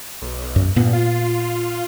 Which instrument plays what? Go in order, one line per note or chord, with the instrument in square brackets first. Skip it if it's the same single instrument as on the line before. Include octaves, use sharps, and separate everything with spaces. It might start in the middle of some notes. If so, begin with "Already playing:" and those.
[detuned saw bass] B1
[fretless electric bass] F#2
[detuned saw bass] G2 [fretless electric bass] A#2 B3
[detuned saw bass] F4